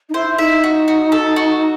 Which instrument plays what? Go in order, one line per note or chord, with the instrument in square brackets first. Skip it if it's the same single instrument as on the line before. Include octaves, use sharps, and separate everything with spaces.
[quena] D#4
[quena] E4 [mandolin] C5
[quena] E4
[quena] D#4 [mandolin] E5
[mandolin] F#4
F#4
A4
F#4